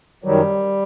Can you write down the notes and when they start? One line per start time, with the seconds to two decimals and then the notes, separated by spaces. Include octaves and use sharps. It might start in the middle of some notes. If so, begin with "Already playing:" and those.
0.24 F#2 D#3 F#3 G3